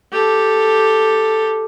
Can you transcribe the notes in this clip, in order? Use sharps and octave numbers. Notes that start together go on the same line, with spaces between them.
G4 A4